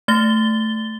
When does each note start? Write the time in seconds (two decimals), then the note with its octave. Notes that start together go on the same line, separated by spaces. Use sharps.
0.08 A3 A6 G7